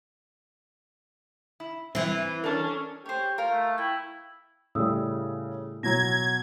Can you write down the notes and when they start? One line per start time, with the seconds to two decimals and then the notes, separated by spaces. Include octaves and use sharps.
1.60 E4
1.95 E3 C4 E4
2.44 C#4 D4 A4 A#4
3.06 G4 C5 C#5
3.38 F4 A#4
3.50 A3
3.78 E4 G5
4.75 A2 C#3 G3 D#6 E6
5.83 B2 F#3 A#5 G#6 A#6